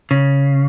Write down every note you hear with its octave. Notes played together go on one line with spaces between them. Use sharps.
C#3